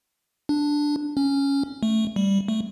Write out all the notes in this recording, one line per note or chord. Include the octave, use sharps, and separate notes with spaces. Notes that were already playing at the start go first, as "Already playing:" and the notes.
D4
C#4
A3
G3
A3